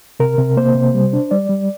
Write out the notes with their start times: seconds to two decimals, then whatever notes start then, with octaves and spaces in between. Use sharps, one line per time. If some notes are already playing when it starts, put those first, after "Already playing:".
0.20 C3 A#4
0.38 C3
0.57 A#3 C5
0.75 C3
0.94 G3
1.13 D4
1.31 G3 D5
1.49 G3